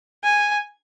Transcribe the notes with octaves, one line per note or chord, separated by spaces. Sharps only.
G#5